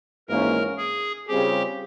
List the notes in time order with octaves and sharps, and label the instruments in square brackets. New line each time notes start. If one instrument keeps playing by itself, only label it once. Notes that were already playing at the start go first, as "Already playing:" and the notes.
[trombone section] G#1 G#2 E3 A#3 C#4 [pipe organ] A#4
[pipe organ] G#4
[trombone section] C#3 G3 C4 F4 G#4 [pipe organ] G4